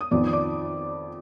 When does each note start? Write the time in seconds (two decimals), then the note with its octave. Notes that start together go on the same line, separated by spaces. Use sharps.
0.01 D#6
0.11 F2 D#3 B3 D5 D6
0.27 D#6
0.33 D5 D6